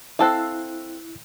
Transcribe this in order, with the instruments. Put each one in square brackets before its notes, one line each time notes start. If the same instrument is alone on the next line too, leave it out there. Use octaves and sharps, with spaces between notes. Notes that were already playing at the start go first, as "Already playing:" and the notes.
[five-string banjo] C4 A4 F5 [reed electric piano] E4 E6 F#6